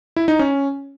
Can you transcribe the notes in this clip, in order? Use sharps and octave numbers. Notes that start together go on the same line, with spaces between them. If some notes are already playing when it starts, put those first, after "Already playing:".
E4
D#4
C#4